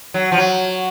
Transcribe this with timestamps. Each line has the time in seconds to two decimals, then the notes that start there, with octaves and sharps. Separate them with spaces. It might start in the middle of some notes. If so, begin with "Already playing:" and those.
0.14 F#3
0.32 F3
0.38 F#3